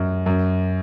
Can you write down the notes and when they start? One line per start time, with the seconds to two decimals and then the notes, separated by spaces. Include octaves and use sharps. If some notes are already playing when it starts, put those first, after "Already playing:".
Already playing: F#2
0.26 F#2